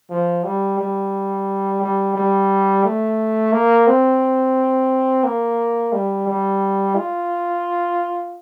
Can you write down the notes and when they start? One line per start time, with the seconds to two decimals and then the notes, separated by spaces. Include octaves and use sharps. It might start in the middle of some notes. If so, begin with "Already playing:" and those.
0.10 F3
0.44 G3
0.79 G3
1.82 G3
2.16 G3
2.84 A3
3.52 A#3
3.87 C4
5.24 A#3
5.93 G3
6.27 G3
6.96 F4